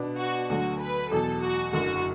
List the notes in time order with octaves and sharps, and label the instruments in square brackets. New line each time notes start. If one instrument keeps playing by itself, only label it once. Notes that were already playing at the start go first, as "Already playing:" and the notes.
Already playing: [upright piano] B2 B3 D4
[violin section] F#4
[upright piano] D2 D3 F#3 [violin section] F#4
[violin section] B4
[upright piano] E2 B2 F#3 [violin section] A4
[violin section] F#4
[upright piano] F#1 F#2 D3 [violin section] F#4